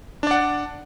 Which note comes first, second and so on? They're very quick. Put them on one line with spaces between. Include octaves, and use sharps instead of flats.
D4 D5 F#5